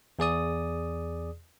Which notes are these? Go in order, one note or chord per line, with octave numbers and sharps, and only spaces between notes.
E2 G#4 D5 D#6